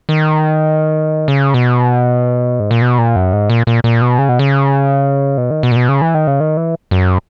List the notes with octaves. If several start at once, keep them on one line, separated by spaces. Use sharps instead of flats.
D#3
C#3
B2
G#2
A#2
B2
A#2
F#2
G#2
A#2
A#2
A#2
B2
C#3
B2
C#3
B2
D#3
B2
A#2
B2
C#3
E3
D#3
C#3
D#3
E3
F#2